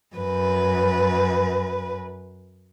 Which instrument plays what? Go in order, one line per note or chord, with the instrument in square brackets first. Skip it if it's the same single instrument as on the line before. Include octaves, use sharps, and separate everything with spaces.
[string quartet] F#2 B4